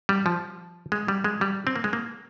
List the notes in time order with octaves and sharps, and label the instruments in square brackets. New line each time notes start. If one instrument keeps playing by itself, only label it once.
[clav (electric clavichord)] G3
F3
G#3
G3
G#3
G3
C4
A#3
G#3
A#3